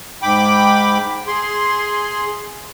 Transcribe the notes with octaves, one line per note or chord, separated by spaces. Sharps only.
G#2 G5 B5 D6
G#4 C6